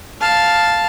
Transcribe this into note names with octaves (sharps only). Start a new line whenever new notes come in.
F5 A5